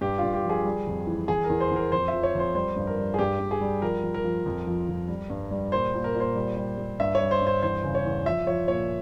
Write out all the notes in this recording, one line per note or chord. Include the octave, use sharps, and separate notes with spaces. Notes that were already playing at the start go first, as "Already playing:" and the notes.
G2 G4
G2 F4
G4
F3
G#4
G3
F2
E3
E2 G#4
A#4
E2
C5
E2
A#4
F2 C5
E5
F3
C#5
F2 C5
G3 C5
G2
A#4
G3
G#4
G2 G4
G2
G#4
G3
F3 A#4
F3
A#4
F3
F2
F3
F2
G3
G2
G3
A#2 C5
A#2
A#4
A#2
C5
G3
G3
G3
G2 E5
C#5
G3
C5
G2
C5
E2 C5
C#3
C#5
E2
F3 E5
F3 C#5
A#2 C#5